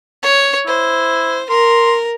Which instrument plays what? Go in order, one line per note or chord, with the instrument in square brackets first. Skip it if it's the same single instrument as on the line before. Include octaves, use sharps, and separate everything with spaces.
[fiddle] C#5
[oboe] E4 [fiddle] C5
[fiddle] A#4 [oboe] C6